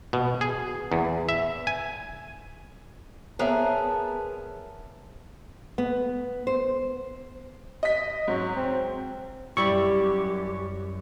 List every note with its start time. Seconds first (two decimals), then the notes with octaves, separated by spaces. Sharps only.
0.13 B2
0.41 G#4
0.92 E2
1.29 E5
1.67 G#5
3.39 B3 G#4 A#4 C5 C#5 E5 A5
5.78 B3
6.47 C5
7.83 D#5 B6
8.28 G#2 F#3
8.56 C4
9.57 F#2 G3 E4 G4 C#6